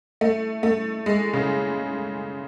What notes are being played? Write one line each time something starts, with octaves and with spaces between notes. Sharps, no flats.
A3
A3
G#3
C#3